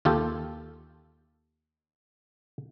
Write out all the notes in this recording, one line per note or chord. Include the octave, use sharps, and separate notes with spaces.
D#2 F4 G4 A4